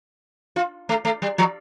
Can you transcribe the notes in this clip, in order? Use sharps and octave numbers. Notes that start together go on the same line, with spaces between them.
F4
A3
A3
G3
F3